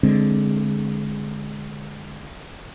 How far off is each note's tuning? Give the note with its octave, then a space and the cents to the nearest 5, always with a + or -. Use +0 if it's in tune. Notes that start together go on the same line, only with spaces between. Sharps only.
D3 +0 G#3 +0 C4 +0